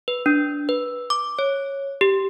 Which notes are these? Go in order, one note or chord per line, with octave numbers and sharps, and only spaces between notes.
B4
D4
B4
D6
C#5
G4